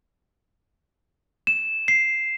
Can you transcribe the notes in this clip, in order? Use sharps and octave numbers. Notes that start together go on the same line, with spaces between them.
E7
C7